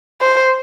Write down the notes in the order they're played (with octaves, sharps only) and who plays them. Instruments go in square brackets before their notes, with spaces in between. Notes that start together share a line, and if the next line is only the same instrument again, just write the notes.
[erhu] C5